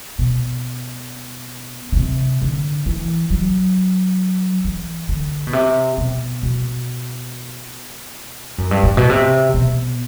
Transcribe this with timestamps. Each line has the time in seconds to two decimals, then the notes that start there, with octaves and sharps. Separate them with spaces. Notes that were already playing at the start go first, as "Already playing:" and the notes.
0.19 B2
1.92 D3
1.97 C3
2.42 D3
2.86 E3
3.31 F#3
4.64 E3
5.09 D3
5.47 B2
5.53 C3
5.98 B2
6.43 B2
8.58 F#2
8.71 G2
8.83 A2
8.97 B2
9.10 C3
9.54 B2